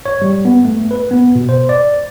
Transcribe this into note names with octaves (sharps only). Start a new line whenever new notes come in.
C#5
G3
B3
A3
B4
B3
B2
C5
D5